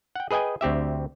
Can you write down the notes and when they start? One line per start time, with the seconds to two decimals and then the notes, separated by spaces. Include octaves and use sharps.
0.15 F#5 G5
0.31 G#4 B4 D#5 G5 G#5
0.61 D2 C4 G4 E5